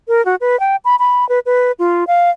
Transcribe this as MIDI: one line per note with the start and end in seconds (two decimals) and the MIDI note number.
0.08 0.24 70
0.25 0.35 66
0.41 0.59 71
0.60 0.76 79
0.85 0.96 83
0.99 1.27 83
1.29 1.39 71
1.46 1.72 71
1.79 2.04 65
2.07 2.30 77